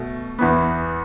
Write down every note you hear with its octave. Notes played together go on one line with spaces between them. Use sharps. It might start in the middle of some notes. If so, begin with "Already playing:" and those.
Already playing: B2 A3
E2 E3 B3